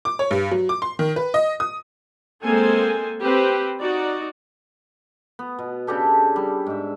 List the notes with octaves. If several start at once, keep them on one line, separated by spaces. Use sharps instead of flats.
D6
C#5
G2
F#3
D6
C6
D#3
B4
D#5
D#6
G#3 A#3 C4 A4 C5 G#5
C4 G4 B4 C5
D#4 F#4 D5
B3
B2
C#3 D4 G4 A4
G3
G#2 E5